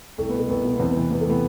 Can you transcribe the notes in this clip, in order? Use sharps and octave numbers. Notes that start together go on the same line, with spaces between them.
C2 A3
B3
B2
A3
C2 B3
B2
B3
E2 C4
B3
C3 E3
E2 B3
A3
C3 E3 B3